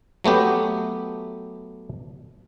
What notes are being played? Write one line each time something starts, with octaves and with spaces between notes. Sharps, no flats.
F#3 A3 B3 G4